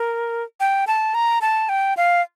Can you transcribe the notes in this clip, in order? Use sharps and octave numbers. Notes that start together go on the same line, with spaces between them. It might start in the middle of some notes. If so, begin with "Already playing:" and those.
Already playing: A#4
G5
A5
A#5
A5
G5
F5